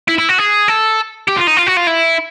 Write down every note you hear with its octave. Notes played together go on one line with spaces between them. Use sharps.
E4
E4
F#4
G#4
A4
G4
F4
D#4
F4
F#4
F4
E4